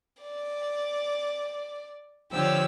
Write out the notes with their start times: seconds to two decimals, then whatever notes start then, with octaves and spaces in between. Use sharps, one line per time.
0.23 D5
2.32 D3 F3 G4 C#5 E6